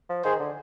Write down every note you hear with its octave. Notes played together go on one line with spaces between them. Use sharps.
F3
D#3 G#4 C5
D3